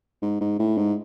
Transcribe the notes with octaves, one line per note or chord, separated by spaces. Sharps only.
G#2
G#2
A2
G#2